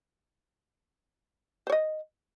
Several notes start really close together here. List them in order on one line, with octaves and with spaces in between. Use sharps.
C5 C#5 D#5